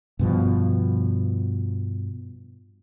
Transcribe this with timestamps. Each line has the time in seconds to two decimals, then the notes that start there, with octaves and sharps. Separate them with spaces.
0.19 G2 B2 F3